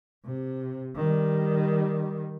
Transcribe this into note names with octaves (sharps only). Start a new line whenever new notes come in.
C3
D#3 G3